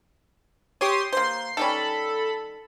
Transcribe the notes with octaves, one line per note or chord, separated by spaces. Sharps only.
G4 C#5 C6 D#6
A#3 C5 C6
D#3 G3 C#4 A4 B5